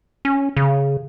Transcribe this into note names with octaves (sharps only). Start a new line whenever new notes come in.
C#4
C#3